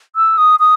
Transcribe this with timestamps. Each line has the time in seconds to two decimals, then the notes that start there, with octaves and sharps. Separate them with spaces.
0.16 E6
0.38 D#6
0.60 D#6